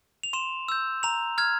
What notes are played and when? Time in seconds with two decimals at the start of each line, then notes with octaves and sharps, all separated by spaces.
0.23 F7
0.33 C6 E7
0.68 E6 G6
1.03 A#5 F7
1.38 F6 G#6